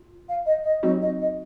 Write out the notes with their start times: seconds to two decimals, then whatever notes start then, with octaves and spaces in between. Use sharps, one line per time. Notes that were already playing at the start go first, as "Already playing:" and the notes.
Already playing: F4
0.28 F5
0.46 D#5
0.64 D#5
0.83 F#3 C4 D#4 F#4 D#5
1.01 D#5
1.20 D#5